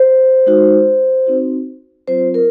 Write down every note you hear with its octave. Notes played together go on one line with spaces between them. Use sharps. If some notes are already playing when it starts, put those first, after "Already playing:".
Already playing: C5
G#3 D#4 F#4
C4 D#4 F#4
F#3 C4 F4 C5
A#4